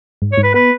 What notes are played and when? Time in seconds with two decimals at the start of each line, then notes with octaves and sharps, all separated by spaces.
0.22 G#2
0.32 C#5
0.38 G#2
0.43 B4
0.54 B3 B4